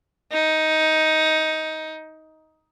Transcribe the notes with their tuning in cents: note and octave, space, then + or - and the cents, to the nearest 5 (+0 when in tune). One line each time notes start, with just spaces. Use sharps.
D#4 +15